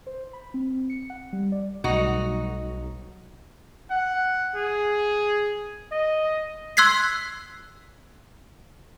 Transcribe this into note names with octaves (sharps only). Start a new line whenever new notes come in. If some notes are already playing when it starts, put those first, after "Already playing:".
C5
B5
C4
C#7
F#5
G3
D5
B1 B2 G3 A3 D#4 F#4
F#5
G#4
D#5
C6 E6 F#6 G#6 B6 C7